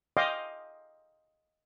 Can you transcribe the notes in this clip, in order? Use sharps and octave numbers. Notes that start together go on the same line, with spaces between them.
D#5 F5 G5 C6 D6